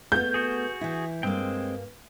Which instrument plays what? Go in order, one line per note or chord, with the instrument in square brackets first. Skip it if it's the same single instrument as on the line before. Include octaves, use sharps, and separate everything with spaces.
[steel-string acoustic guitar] A3 B3 [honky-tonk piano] G6
[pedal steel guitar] F#4 G#4
[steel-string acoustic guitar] E3 E4
[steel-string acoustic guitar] G2 A#3 [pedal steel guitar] G#3 C4 G5